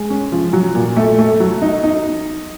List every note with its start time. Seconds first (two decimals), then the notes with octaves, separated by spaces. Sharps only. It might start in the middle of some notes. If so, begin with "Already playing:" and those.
Already playing: G#3
0.10 C#4
0.32 F3
0.53 F#3
0.75 A#2
0.97 A3
1.19 A3
1.40 F#3
1.62 D#4
1.83 D#4